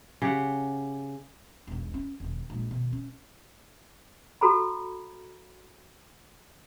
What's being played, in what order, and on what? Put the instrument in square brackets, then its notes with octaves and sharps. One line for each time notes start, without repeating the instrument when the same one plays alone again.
[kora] C#3 G4 F#5
[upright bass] E1 B1
C#4 E4
E1 D#3
A#1 G#3
B2 D#3
C#4
[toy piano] F#4 A4 A#5 B5